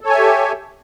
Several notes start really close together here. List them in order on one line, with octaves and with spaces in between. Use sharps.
A4 C#5 G#5 E5 G4